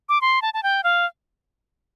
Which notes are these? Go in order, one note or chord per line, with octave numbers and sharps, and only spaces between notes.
D6
C6
A5
A5
G5
F5